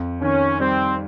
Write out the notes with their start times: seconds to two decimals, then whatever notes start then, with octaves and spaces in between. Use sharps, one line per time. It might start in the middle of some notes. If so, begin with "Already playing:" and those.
Already playing: F2
0.21 D#3 C#4
0.60 G3 C4